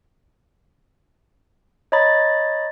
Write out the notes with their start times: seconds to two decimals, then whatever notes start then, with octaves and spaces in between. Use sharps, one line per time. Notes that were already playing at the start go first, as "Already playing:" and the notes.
1.92 C#5 D#5 A#5 B5 A6